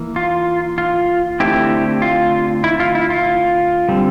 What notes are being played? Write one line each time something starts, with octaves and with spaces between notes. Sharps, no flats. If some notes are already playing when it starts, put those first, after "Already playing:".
Already playing: E3 A#3
F4
F4
D3 A3 C4 E4 G4
F4
E4
F4
E4
F4
D3 G3 C4